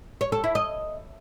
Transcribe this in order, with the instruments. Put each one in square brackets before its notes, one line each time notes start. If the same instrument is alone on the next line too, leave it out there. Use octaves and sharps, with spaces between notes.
[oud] C#5
A4
E4
D#5